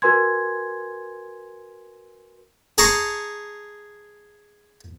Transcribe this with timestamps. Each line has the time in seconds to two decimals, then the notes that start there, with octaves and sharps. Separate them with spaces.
0.02 F#4 A#4 B4 G#5 C6 G#6
2.78 G#4 A5 A#5 C6 C#6